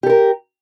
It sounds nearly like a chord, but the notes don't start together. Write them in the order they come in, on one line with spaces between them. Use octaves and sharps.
G4 A4 A#4